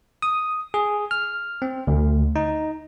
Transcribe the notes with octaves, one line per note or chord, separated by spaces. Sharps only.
D#6
G#4
F6
C4
D2
D#4